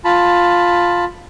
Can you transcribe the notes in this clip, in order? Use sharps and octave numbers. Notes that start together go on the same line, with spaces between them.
F4 A5 B5